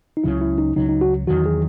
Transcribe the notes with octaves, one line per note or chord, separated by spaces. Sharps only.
D#4
C#2 C#3 F#3 E4
E4
D#4
C#2 C#3 F#3 D#4
D#4
F#4
E2 D#3 F#3 F#4
G#4